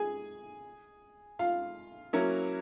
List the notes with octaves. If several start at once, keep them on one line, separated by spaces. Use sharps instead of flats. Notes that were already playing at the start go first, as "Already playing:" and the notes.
Already playing: G#4 G#5
F4 F5
F#3 A#3 C#4 E4